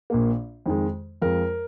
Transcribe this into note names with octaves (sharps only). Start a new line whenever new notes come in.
A#1 A#2 A#3
F2 D#3 G#3
F2 F3 G#3 A#4